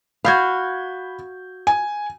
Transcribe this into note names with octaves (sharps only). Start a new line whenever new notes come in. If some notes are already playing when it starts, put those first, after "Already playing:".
F#4 F5 B5 G6 G#6
G#5